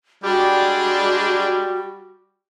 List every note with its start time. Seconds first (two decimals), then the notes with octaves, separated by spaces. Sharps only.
0.24 G3 G#3 D4 F#4 G4